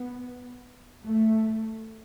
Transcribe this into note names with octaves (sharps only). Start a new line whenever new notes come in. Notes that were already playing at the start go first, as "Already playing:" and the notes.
Already playing: B3
A3